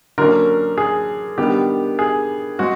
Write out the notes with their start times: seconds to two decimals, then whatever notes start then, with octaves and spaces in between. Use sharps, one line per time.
0.18 D3 F#3 A#3 C#4 A#4
0.78 G#4
1.38 D#3 G3 B3 D4 G4
1.99 G#4
2.59 G#3 C4 F#4